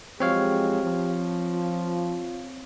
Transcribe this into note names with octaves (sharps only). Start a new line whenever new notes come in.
F3 F#3 G#3 C4 G4 C#5 F5
F3
F4